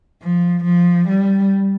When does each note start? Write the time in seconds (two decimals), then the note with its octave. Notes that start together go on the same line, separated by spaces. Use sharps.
0.22 F3
0.64 F3
1.08 G3